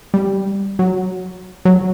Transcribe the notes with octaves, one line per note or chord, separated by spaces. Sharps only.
G3
F#3
F#3